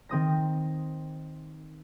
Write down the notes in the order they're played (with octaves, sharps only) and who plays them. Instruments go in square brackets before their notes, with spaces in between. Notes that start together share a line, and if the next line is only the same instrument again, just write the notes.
[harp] D#3 C4 D#6 A#6